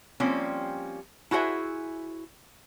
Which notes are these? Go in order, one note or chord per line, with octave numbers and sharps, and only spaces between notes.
F3 G3 A#3 C4 C#4
E4 F#4 G#4 C5 E5